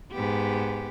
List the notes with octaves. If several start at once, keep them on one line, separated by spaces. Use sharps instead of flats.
G#2 B3 G4